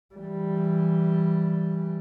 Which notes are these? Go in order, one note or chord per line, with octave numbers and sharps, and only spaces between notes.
E3 G3